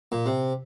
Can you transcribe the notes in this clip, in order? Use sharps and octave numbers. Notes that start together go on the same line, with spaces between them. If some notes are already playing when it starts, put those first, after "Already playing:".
A#2
C3